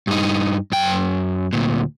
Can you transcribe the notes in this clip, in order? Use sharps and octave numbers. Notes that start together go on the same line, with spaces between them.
G2 D#4
F#2 G5
D2 A#2